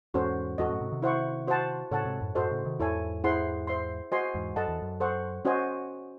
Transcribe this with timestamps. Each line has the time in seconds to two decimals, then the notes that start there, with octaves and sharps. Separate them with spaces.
0.14 E2 G#2 C#4 F#4 A4 C5
0.58 E2 G#2 F#4 A4 D#5
0.69 F#2 A2
0.81 G#2 C3
0.91 C3 D#3
1.02 E4 C5 F#5 C#6
1.47 F#4 C5 F#5 A5
1.91 A2 C#3 A4 C#5 F#5 A5
2.05 G#2 C3
2.21 F#2 A2
2.35 F#2 A2 F#4 A4 C5 D#5
2.50 A2 C#3
2.65 C3 D#3
2.80 E2 G#2 E4 A4 C#5 G#5
3.24 E4 G#4 C5 F#5 C6
3.67 C5 E5 C6
4.12 F#4 C5 D#5 G#5 C6
4.34 E2 G#2
4.56 F#2 A4 D#5 F#5 A5
4.68 E2
4.82 F#2
5.00 A4 C5 F#5 C#6
5.45 C#4 F#4 C5 D#5 G#5